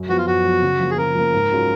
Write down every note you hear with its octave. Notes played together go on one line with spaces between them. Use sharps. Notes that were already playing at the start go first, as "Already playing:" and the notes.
Already playing: F#2
F3 B3 F#4
F4
F#2 F#4
F3 B3
C#3
F3 A#3
G#4
C#3 A#4
F3 A#3
G#2
F#3 C#4 F4 G#4